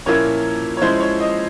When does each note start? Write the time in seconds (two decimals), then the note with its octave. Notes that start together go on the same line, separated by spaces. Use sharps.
0.06 A#2 F3 A#3 C#4 E4 C#5
0.77 C#5
0.82 F3 G#3 C#4 E4 C5
1.00 C#5
1.20 D#5